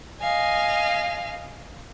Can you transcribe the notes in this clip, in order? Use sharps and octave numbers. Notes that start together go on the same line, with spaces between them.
D#5 F5 G#5